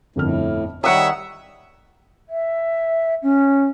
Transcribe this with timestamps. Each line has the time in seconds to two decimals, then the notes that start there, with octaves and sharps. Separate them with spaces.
0.16 G1 F2 A2 F6
0.84 D#3 G3 C#5 E5 F#5 G5 A#5 D#6
2.29 E5
3.23 C#4